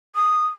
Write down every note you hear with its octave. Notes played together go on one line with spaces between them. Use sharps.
D#6